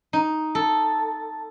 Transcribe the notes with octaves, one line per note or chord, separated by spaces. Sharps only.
D#4
A4